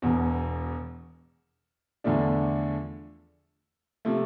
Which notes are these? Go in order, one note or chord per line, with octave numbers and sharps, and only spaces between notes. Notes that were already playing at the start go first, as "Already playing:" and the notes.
E1 E2 B2
E2 D3 F3 A3 D4
C3 F3 A3